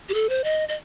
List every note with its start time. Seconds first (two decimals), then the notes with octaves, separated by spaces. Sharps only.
0.09 G4
0.14 A4
0.29 C5
0.44 D#5
0.69 D#5